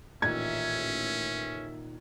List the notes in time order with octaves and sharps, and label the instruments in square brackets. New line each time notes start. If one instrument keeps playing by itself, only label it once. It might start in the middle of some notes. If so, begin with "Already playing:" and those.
[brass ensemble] A1 E5 [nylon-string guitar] A#2 D#3 D#4 [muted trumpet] C#4 [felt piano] G#6